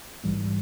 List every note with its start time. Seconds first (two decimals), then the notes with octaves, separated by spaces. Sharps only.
0.24 A#1 G#2 E3 G3